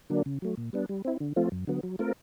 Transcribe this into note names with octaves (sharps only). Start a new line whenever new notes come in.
D3 F#3 A#3 D4
C#3
F#3 A3
A#2
G3 B3 D4
G3
C4 E4
D3
F3 A3 C4 F4
F#2
D3 F#3 B3
F#3
A3 C4 F4 A#4